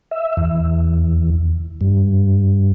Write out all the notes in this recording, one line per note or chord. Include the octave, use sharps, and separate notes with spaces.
E5
E2
G2